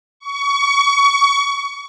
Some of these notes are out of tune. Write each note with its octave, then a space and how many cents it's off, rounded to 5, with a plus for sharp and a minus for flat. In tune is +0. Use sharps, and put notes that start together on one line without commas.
C#6 +25